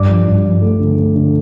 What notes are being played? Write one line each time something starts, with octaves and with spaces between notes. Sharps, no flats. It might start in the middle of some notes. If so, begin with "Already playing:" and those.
Already playing: G2 D5 D6
F3
G2
F3
A3
D3
A3
D3